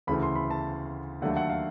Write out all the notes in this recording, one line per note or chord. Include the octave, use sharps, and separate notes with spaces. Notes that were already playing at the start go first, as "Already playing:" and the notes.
D2 C#3 E3 A3 B5
C6
B5
A5
D#2 D3 F#3 A3 F#5
F#5
F5